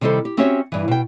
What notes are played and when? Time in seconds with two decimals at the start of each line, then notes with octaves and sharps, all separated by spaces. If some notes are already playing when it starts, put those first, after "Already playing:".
0.01 C3 D#3 G3 E4 A4 C5
0.25 G4
0.37 C4 C#4 F#4 G4 C#5 E5
0.72 G2 E3
0.88 B2 G5